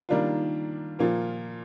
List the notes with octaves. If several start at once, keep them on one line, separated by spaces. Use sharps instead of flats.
D#3 G3 A#3 D4 F4
A#2 F3 A#3 F4